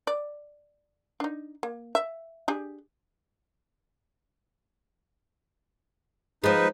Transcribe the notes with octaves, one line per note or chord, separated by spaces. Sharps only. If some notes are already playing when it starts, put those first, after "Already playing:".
D5
D4 D#4
A#3
E5
D4 G4 G#4
F3 G#3 D#4 B4